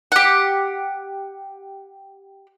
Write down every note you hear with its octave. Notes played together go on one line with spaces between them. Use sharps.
G4 F#5